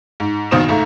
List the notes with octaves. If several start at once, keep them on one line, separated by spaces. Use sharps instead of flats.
G#2
A#1 B2 D#3 C5 D#6 E7
C#2 G#2 A3 A#5